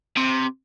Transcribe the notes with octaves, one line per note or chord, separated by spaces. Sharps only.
C3